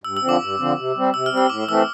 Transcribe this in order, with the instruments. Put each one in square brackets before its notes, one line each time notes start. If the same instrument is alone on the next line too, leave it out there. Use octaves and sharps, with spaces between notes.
[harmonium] G2 [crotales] E6
[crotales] E6
[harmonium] D3 F3 C4
[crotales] D6
[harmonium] G2
D3 F3 C4
C3
G3 C4
[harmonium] C3 [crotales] E6
[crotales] F6
[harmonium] G3 C4
[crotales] E6
[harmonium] A2 [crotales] D6
[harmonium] E3 A3 C4 [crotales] E6